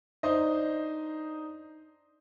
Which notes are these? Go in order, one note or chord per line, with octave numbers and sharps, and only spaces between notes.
D4 D#4 C5 D#5